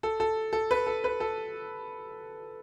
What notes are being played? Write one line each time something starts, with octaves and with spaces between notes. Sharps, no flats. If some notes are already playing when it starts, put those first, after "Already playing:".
A4
A4
A4
B4
A4
B4
A4